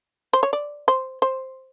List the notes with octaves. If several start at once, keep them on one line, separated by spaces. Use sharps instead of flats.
C5
C#5
D5
C5
C5